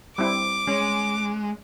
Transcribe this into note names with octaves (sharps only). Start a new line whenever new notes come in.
G3 C4 E4 D6
G#3 C#4